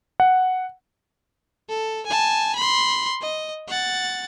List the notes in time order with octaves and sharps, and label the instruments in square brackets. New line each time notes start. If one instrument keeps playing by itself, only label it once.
[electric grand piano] F#5
[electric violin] A4
G#5 A5
B5 C6
D#5
F#5 A6